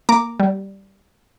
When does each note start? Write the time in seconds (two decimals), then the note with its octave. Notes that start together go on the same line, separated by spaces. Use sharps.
0.09 A#3 A#5 D6
0.40 G3